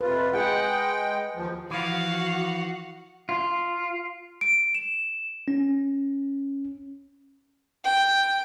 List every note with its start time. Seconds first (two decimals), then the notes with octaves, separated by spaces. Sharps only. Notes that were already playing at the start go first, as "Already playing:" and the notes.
0.01 F2 C3 F4 B4
0.33 G#3 G#4 F#5 G5
1.35 D#2 F3
1.71 E3 F3 F#4 F5 F#5
3.29 F4
4.41 D7
4.75 E7
5.48 C#4
7.84 G5